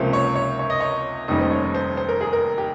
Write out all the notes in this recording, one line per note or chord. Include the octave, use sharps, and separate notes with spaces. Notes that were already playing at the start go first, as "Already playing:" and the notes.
Already playing: C#2 C3 F3 A#3 C#4 C5
C#5
C#5
C#5
D#5
C#5
F1 D#2 D#3 G3 C#4 D#5
C5
C#5
C5
C5
A#4
G#4
A#4
G4